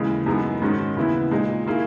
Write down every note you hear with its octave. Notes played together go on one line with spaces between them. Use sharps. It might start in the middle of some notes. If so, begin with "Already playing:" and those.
Already playing: D#2 C#3 E3 G#3
F#2 E3 G#3 B3 D#4
G#2 D#3 G#3 C#4 F#4
D#2 C#3 E3 B3 E4
A#2 G#3 D#4
D#3 A#3 E4 G#4